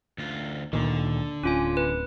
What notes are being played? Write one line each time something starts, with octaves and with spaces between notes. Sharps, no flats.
D2 F4
D2 A#2 D3 D#3
D1 C#4 F4 G#5
B4